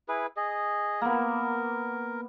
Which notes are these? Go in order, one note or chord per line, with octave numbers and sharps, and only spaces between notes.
E4 G#4 B4
G#4 D#5
A#3 B3 A#4